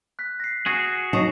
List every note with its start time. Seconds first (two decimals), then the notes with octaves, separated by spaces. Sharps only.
0.19 F#6 B6
0.40 A#6 C7
0.66 F#4 G#4
1.13 F#3 D#4 A5 C#6 E7